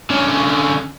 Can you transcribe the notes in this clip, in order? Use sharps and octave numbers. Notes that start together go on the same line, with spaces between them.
D3 C#4